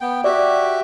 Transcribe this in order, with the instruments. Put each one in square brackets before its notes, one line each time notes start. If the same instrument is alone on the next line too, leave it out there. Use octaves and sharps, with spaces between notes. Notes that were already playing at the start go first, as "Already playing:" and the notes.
[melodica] B3 G5
[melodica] F#4 G4 E5 [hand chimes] D5